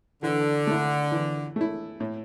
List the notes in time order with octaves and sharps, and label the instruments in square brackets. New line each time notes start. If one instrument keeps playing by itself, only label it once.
[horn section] D3 [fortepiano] E3
[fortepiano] A3 E4
E3
A3 E4
A2